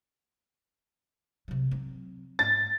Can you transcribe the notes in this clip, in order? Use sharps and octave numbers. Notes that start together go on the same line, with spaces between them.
C3 F#3
F#3 C4
G#2 A6